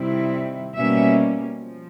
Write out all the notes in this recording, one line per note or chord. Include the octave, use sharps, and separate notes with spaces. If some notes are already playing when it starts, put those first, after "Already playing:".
Already playing: C3 D#3 G3 C4 E4
B2 G3 A#3 C#4 E5
F3